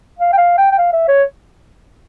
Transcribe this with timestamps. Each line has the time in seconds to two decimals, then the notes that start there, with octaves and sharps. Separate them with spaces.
0.19 F5
0.33 G5
0.38 F5
0.58 G5
0.71 G5
0.78 F5
0.93 E5
1.08 C#5